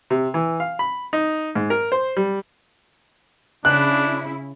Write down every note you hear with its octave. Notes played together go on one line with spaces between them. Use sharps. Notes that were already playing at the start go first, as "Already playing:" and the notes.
C3
E3
F5
B5
D#4
G#2
A#4
C5
G3
C#3 D4 E4 F#6